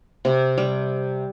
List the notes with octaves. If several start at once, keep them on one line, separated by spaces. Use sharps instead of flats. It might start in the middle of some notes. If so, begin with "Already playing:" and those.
C3
G3